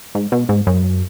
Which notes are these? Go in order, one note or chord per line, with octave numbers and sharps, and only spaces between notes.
G#2
B2
G#2
F#2